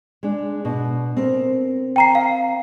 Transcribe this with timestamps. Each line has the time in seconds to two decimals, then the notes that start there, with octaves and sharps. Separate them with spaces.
0.23 G#3 D4
0.64 B2 D4
1.17 C4 A#4
1.96 G5 A#5 C7
2.15 F5